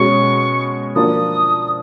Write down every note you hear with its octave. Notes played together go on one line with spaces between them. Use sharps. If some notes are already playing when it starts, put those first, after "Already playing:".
Already playing: B2 G#3 C#4 C#6
F3 A#3 D4 F#4 A#4 D#6